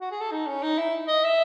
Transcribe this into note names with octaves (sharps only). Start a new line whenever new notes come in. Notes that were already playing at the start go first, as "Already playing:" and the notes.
F#4
G#4
A4
D#4
C#4
D#4
E4
D#5
E5